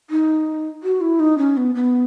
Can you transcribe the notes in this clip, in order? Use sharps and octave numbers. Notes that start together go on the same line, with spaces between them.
D#4
F#4
E4
D#4
C#4
B3
B3